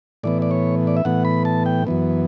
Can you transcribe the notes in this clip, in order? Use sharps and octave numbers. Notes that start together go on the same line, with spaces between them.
A2 E3 B3 D5
D5
C#5
D5
E5
A2 E3 B3 F#5
B5
A5
G5
F#2 E3 B3